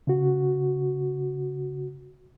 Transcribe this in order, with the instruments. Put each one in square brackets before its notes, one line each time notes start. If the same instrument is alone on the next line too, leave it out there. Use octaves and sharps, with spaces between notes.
[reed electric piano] C#3 F#4